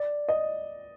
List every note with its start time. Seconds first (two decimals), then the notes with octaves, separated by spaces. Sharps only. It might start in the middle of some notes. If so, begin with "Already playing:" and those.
Already playing: D5
0.29 D#5